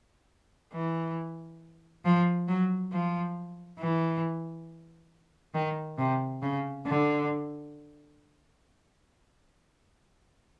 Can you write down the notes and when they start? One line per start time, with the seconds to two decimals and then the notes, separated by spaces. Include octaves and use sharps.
0.74 E3
2.05 F3
2.48 F#3
2.92 F3
3.80 E3
5.54 D#3
5.98 C3
6.42 C#3
6.86 D3